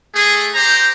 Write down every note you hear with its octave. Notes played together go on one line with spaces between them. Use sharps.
A3 G#4
G4 C5 A#5